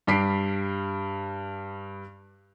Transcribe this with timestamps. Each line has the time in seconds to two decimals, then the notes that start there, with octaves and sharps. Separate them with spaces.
0.07 G2 G3 B6 C7 D7